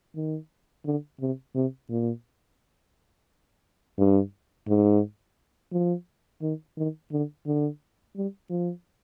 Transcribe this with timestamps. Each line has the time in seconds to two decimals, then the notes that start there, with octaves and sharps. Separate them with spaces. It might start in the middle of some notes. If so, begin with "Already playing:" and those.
0.16 D#3
0.85 D3
1.20 C3
1.55 C3
1.90 A#2
3.98 G2
4.68 G#2
5.72 F3
6.42 D#3
6.77 D#3
7.12 D3
7.46 D3
8.16 G3
8.50 F3